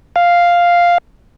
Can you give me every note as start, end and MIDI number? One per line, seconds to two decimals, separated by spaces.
0.16 0.98 77